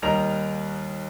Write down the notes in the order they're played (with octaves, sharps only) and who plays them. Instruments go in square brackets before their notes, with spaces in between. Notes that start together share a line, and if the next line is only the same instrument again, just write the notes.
[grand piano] D#2 G3 A#4 D#5 A#5 F7